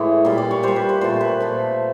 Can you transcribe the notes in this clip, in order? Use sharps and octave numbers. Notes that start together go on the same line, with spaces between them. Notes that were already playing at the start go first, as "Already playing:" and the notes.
Already playing: A2 E3 G#3 C#5
A#2 G3
D5
C#5
A#2 G3 C5
B4
C5
A#2 F3 A3 C5
B4 C5
A#2 F3 A3